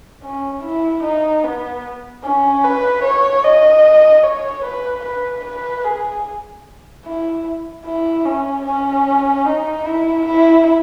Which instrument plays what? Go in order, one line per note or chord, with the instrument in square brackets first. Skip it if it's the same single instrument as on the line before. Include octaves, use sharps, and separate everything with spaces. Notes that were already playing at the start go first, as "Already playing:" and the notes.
[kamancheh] C#4
E4
D#4
B3
C#4
B4
C#5
D#5
C#5
B4
B4
B4
G#4
E4
E4
C#4
C#4
D#4
E4
E4